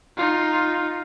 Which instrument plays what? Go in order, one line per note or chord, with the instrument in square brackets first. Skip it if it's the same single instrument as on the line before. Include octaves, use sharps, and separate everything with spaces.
[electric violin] D#4 F4